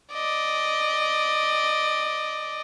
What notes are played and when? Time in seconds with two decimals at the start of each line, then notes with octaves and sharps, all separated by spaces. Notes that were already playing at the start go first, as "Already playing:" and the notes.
0.13 D5 D#5